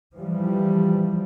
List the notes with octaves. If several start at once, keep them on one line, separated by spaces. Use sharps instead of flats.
E3 F3 G3